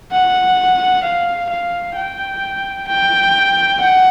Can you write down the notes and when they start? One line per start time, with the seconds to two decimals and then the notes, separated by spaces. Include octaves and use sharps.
0.12 F#5
1.04 F5
1.50 F5
1.96 G5
2.88 G5
3.80 F#5